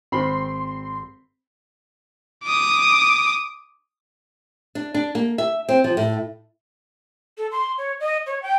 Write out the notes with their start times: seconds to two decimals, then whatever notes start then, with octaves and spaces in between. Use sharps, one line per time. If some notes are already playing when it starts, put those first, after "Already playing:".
0.12 G#1 C4 B5 C6
2.44 D6 D#6
4.75 D4
4.94 D4
5.15 A#3
5.38 E5
5.69 C4
5.84 F3
5.97 A2
7.38 A4
7.52 C6
7.78 C#5
8.00 D#5
8.26 C#5
8.43 G5